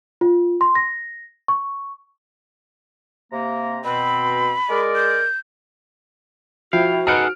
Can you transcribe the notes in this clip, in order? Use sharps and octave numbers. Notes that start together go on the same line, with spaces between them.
F4
C6
A#6
C#6
C3 A#3 A#5
B2 C4 B5
G#3 A#4 D5
G6
F3 E4 F#4 F5 G5
D#4 G#4 A4 B4 F#5 F6 D7